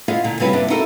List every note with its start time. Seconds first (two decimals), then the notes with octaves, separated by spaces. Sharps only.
0.08 B3 E4 F4 D#5 F5
0.24 A#2 D3
0.40 C#3 F#3 G3 C4 F4 B4
0.53 G2 C3 A#3 B3 D4
0.70 D#4 E4 F#4 A4 A#4